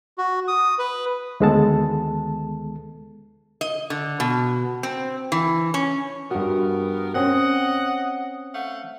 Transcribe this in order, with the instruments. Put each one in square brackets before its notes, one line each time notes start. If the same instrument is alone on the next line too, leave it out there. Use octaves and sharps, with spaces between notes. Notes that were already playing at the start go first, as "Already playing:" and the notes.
[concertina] F#4
D#6
B4
[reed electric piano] D2 D#3 G#3 B3 A4 A5
[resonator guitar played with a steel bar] D#5
D3
B2
C4
E3
C#4
[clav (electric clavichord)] G2 F#4 [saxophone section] B3 A#4
[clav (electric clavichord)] C4 C#4 [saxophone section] D#5 F#5
[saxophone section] A3 F5 F#5